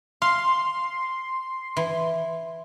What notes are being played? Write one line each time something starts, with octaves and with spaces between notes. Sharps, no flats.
F5 C6
E3